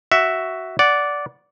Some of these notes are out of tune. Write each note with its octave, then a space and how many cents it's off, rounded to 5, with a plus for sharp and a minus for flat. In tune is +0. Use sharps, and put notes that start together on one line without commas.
F#4 +10 E5 +0
D5 -10 F#5 +0